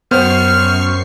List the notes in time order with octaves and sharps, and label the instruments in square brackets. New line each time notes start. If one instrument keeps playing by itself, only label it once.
[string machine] F#2 C#6 C7 [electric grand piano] B3 [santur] C5 F#5 G5 [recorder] F6